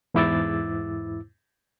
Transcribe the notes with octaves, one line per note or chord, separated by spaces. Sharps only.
E2 G#2 E4 D6 E6 A6